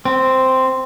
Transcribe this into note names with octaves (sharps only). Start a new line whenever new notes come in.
C4